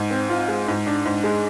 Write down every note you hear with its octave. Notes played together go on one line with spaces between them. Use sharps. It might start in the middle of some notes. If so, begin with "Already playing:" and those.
Already playing: G#2
C4
F4
G#3
G#2
D4
G#2
G#3